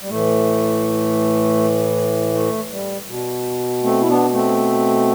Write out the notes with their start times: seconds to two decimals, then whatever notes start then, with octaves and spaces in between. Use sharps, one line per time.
0.02 G3
0.09 A2 E3 A3
2.34 A3
2.72 G3
3.09 B2
3.83 A3 C4
4.01 E4
4.09 B3 D4
4.33 A3 C4